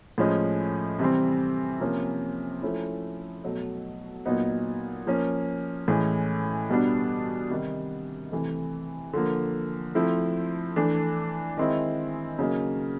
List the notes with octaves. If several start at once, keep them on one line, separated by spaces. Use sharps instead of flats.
A2 F3 G#3 C#4
C3 E3 G3 C4
C3 F3 A#3 C#4
F3 A3 C#4 E4
B2 F#3 A3
A#2 F#3 B3 D#4
F3 A#3 C#4
A2 E3 G#3 C#4
B2 G3 B3 D4
C3 D#3 G3
C3 E3 A3
D3 F3 A#3
F3 A3 C4 E4
E3 A3 D4
D#3 G#3 C4 E4
C#3 F#3 A#3 D#4